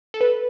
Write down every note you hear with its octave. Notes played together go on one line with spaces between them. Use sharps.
A4
B4